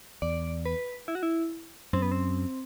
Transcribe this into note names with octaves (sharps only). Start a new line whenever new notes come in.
E2 D5
B4
E4
F#4
E4
F#2 C4
B3
C4